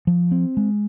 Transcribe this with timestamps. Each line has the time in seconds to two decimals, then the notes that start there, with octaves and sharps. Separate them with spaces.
0.07 F3
0.31 C4
0.57 G#3